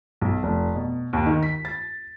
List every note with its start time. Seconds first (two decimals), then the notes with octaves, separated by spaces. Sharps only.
0.21 B1
0.43 F1
0.75 B2
1.13 D#2
1.26 D#3
1.43 B6
1.65 A6